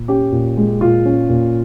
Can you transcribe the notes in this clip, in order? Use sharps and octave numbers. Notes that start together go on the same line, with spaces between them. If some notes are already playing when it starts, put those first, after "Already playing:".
Already playing: A#2
C#4 G4
A#2
G#3
A#2 F4
C#4
A#2